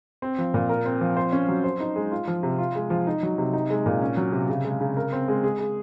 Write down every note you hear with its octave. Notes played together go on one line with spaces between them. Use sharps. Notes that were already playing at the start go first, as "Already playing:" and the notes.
C4
F3
A#2
A#4
C4
F3
C5
C#4
F#3
C5
D#4
G#3
F4
F3
C3
F4
G#3
F3
D#4
F#3
C3
D#4
G#3
A#2
C#4
F#3
C3
C#3
G#3
C#3
A#4
C4
G#3
G#4
G#3